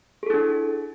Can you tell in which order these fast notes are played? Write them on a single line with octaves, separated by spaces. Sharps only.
G#4 A4 E4 D4